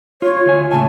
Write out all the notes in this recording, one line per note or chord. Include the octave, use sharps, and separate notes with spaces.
F4 C#5
D2 F4 G#5
A2 C#3 G#5 A5